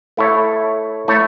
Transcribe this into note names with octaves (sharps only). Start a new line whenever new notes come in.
A3 E4 A4 C#5
A3 E4 A4 C#5